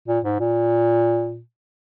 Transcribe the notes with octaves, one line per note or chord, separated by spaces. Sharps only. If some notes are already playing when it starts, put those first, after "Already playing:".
A#2
G#2
A#2